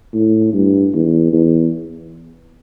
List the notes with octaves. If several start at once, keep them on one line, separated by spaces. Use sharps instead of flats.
A2
G2
E2
E2